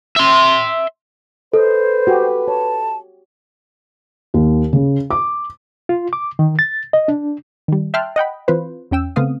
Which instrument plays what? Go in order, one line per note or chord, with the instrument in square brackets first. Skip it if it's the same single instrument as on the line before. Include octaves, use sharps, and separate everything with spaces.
[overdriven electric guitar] E5 C6
[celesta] A4 [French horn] B4 [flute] C5 [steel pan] D#5
[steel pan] F#4 G4
[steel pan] C#5 [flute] A5
[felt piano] D#2
C#3
D6
[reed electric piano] F4
D6
D#3
A6
D#5
D4
[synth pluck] D#3 G3
E5 G5 A5 C6 F6 F#6
D#5 F#5 G5 B5
E3 C4 F4 B4 C5
E2 C#4 G5 E6
C#3 A3 B3 C4 F5 D#6